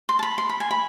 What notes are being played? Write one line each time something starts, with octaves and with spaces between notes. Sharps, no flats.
C6
A5
B5
C6
B5
G#5
B5